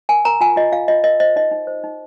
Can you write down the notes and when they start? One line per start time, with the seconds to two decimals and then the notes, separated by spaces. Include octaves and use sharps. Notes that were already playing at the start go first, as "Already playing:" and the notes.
0.09 A#4 G#5
0.25 A#4 A#5
0.41 F4 G#5
0.56 F4 D#5
0.72 F4 F5
0.88 F4 D#5
1.04 A#4 D#5
1.20 C5 D#5
1.36 D#4 D#5
1.51 D#4
1.67 C5
1.84 D#4